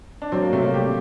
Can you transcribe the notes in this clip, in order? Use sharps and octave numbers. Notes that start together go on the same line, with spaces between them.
D4
F#3 C4
A#3
C3 A3
A#3
G3 G4